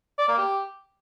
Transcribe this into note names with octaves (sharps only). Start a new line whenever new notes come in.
D5
A#3
G4